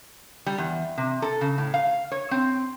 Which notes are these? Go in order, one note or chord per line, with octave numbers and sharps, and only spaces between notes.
G3
E2
C3
A4
C#3
A2
F5
C#5
C4